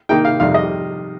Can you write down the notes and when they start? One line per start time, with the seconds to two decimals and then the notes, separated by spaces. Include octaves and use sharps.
0.09 D#3 A#3 D#4 G5
0.25 F5
0.40 F2 C3 D#3 G3 F5
0.54 D#5